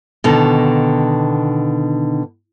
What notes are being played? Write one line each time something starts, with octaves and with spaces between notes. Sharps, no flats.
B2 D3 D#3